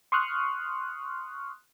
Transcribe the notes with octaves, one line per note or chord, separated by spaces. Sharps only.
C6 C#6 D#6 F6 F#6